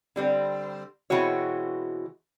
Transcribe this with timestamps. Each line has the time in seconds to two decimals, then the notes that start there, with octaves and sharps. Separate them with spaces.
0.16 D3 G3 C4
1.10 B2 E3 G#3 C4 F#4 C#5